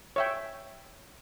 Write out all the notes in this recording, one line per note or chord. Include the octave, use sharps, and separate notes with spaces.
C#5 E5 G5